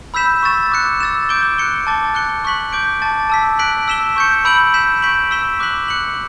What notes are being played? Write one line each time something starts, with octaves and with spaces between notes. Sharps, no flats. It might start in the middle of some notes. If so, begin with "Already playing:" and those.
B5 E6 G6 B6 E7
C#6 E6 A6 E7
D6 F#6 C#7
E6 A6 E7
D6 G6 D7 G7
F#6 C#7 G7
A5 D6 A6
F#6 C#7 G7
C#6 F#6 B6 F#7
D6 G6 D7
A5 D6 A6
A5 E6 B6
F#6 B6 D7 F#7
E6 B6 E7 G7
C#6 G6 C#7
B5 E6 G6 D7 F#7
G6 B6 E7
C#6 G6 B6 D7 F#7
E6 B6 E7 G7
D6 F#6 B6 F#7
F#6 C#7 F#7